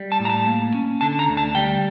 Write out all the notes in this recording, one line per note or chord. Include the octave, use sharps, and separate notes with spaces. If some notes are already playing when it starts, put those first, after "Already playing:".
Already playing: G3
A5
A2
A#5
A5
A#3
C#4
D3 A5
A#5
D2
A5
G3 G5